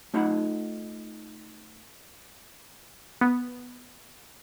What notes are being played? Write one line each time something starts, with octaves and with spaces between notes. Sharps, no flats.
A3 D#4 F4 F#5 B5
B3